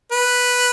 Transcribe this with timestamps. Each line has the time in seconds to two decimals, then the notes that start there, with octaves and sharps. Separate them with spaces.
0.12 B4